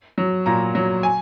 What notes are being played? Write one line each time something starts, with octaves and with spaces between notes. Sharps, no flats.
F#3
A#2 A#5
F#3
G#5